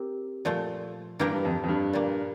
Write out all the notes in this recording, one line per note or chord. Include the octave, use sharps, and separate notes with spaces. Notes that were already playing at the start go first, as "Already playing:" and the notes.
Already playing: C4 G4 A#4
A#2 F3 A3
G2 E3 A#3 E4 G4 A#4
G2
F2
F2
G2
A#2 G3 A#3